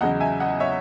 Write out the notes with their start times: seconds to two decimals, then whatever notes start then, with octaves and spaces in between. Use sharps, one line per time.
0.01 E2 C#3 F#3 D#5 F#5
0.20 E5 G#5
0.40 D#5 F#5
0.60 C#5 E5